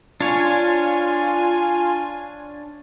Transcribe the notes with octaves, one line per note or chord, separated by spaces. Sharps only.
D4 F4 C#5 G#5